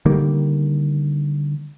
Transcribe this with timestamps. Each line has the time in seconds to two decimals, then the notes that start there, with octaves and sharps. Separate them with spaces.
0.05 D3 D#3 G3 A#3